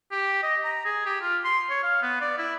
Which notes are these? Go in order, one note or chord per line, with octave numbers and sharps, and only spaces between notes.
G4
D#5
A#5
G#4
G4
F4
C6
C#5
F5
B3
D5
E4